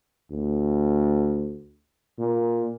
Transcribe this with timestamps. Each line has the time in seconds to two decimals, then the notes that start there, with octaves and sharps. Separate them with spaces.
0.31 D2
2.19 A#2